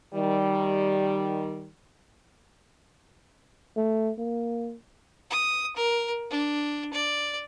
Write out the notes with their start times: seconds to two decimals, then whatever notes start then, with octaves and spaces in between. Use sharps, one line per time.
0.14 D#3 G3
3.76 A3
4.18 A#3
5.31 D#6
5.76 A#4
6.31 D4
6.93 D5